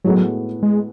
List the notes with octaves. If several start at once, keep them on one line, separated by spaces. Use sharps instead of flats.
A2 F#3 G#3 B3 F#4 A4
G#3